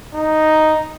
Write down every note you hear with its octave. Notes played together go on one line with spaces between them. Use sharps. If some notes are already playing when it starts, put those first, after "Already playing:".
D#4